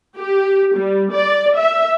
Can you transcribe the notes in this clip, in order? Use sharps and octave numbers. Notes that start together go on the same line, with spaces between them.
G4
G3
D5
E5